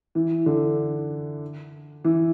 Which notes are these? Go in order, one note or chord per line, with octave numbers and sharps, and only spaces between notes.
E3
D3
E3